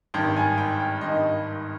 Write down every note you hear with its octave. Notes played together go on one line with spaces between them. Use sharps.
G#1 G2 D#3 G5
G#5
G5
G5
G#1 G2 D#3 D#5